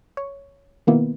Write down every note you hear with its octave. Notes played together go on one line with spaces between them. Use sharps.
C#5
B2 D#3 A#3 B3 E4